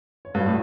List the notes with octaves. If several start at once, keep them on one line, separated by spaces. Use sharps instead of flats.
C#5
G2
F#4
A2